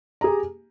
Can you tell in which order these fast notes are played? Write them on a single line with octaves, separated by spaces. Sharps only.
A#5 G#4 G4